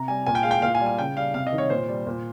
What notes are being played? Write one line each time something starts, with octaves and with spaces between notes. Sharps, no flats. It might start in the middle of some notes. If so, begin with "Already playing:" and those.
Already playing: C3 A#5
G3 G#5
A#2 G#5
G5
G#3 F5
G5
A#2 F5
G#5
G3
G#5
C#3 G5
G3 F5
C3 F5
D#5
D#3 G3
C#5
A#2 C5
G3
A#2